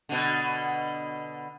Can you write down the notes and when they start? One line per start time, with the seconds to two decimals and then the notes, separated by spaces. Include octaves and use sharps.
0.09 B2 D3